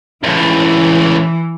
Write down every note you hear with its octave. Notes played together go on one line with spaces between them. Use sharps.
C#2 A2 E3